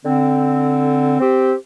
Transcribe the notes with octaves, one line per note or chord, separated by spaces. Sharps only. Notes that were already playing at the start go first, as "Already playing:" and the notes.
D3 C4
C4 G4